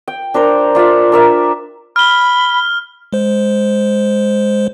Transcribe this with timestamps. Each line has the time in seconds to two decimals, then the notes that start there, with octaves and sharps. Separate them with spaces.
0.08 G5
0.34 D4 A#4 C5 A#5
0.75 D4 F4 D5 E5
1.12 D4 A#4 E5
1.96 B5 F6 G7
3.13 G#3 C5